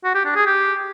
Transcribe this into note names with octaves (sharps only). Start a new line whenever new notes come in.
F#4
G4
D4
G#4
G4